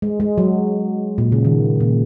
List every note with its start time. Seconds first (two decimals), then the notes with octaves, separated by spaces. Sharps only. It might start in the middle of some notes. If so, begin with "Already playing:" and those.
0.02 G#3
0.20 G#3
0.38 F#3
1.18 A#2
1.32 C#3
1.45 D#3
1.80 A#2